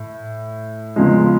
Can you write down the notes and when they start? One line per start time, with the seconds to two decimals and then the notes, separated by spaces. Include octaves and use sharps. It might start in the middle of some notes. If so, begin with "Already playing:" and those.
Already playing: A2
0.96 E2 C#3 F3 G#3